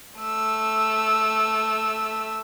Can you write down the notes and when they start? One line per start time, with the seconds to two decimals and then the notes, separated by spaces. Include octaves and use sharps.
0.19 A3 E6